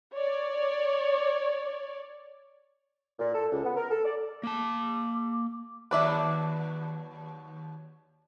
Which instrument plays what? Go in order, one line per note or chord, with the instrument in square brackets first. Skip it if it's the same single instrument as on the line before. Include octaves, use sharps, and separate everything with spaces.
[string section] C#5 D5
[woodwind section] A#2
A4
C#2
B3
A#4
A4
D5
[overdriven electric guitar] A#3 A5 [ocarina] D6
[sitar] D#2 F#3 B4 [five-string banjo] D4 D5 E5